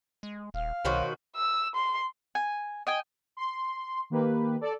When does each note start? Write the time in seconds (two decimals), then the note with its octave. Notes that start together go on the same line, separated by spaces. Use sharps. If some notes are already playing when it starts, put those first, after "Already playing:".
0.23 G#3
0.54 D#1 F5
0.85 C2 B2 D#3 F#4 C5 C#5 C6
1.36 E6
1.75 C6
2.35 G#5
2.87 D#5 G5 G#5
3.37 C6
4.10 D#3 A#3 G4 B4
4.61 A4 D5